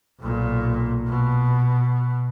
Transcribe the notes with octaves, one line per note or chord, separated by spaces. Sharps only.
B1 A#2
B2